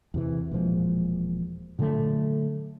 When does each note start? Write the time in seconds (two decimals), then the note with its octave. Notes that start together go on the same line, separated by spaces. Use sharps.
0.14 E2 C3 E3
0.51 E1 A#2 F3 G#3
1.79 A#2 D3 F#3 A3